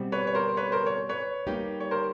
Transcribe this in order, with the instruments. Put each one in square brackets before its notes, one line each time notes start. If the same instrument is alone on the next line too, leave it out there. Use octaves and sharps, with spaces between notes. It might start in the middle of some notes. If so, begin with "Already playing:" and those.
Already playing: [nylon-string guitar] B2 G3 C4
[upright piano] B4 C#5
C#5
A#4 C5
B4 C#5
A#4 C5
C#5
B4 C#5
[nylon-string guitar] G3 A#3 D#4 G4
[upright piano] C#5
A#4 C5